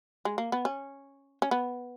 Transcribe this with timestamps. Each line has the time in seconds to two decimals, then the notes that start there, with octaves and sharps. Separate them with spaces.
0.25 G#3
0.38 A#3
0.52 B3
0.65 C#4
1.42 C#4
1.51 B3